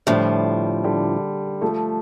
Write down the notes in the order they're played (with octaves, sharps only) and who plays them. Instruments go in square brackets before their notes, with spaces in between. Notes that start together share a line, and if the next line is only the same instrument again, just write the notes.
[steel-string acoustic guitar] A2 F3 D4 [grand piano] D3 G3
[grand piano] D3 G3
F3 A3